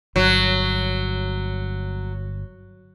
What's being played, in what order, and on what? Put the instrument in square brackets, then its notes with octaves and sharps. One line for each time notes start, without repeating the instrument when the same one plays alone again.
[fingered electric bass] G1 [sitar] F#3